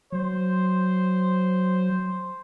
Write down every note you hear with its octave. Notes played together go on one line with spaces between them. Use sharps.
F#3 C5